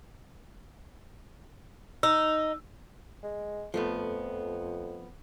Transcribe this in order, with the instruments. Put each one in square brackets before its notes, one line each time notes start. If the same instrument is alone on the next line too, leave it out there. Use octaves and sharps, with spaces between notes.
[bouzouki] D#4 [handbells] E6
[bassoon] G#3
[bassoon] F2 [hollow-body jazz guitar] F3 A3 B3